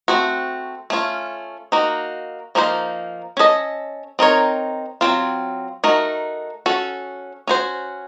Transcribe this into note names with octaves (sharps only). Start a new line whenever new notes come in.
A3 C4 F#4
A3 C#4 F4
A#3 D#4 F#4
F3 A#3 D#4 A4 C5
C#4 A4 D#5
C4 D#4 A#4 C#5
F#3 C4 F4
A3 D#4 F#4 A#4
C#4 F#4 A4
C#4 F#4 C5